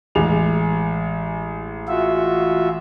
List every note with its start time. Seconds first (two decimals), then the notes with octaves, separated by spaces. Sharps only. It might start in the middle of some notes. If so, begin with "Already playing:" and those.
0.15 A1 G#3 F7
1.88 F4 F#4 E5